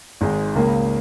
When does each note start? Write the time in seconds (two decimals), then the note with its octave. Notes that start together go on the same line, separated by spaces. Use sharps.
0.21 G#1 G#2 G#3
0.55 C#2 C#3 A#3